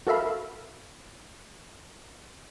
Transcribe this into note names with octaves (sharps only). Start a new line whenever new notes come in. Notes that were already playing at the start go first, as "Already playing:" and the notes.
F#4 A4 A#4 E5 F5 B5